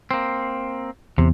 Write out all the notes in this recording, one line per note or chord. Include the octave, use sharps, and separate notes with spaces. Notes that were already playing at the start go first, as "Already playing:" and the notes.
A#3 C4
E2 C3